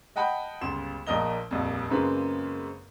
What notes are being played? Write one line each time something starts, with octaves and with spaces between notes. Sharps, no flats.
D#5 F#5 G5 A5 B5
G1 C#2 C6 E7
A#1 A#2 F3 A#4 D#5 G7
D#1 A#1 F2
F#2 C#3 G#3 A#3 C4 B4